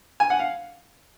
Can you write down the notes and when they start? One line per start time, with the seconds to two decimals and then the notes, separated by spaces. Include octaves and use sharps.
0.20 G#5
0.30 F#5
0.39 F5